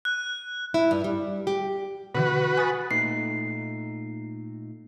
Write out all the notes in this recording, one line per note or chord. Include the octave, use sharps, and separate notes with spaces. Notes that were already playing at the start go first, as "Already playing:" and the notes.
F#6
E4
G2
G3
G4
B2 D3 E3 F#4 B4
G#5 D#6 A6
A#2 A3 D#4 C7